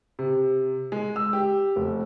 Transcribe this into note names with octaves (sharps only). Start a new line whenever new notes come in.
C3
G#3
E6
G4
F1